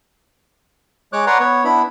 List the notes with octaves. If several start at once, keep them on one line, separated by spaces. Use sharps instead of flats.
G#3 C#5 D6 F#6
B4 C#5 D5 F#5 A#5 C6
B3 C#5
B3 D4 E4 B5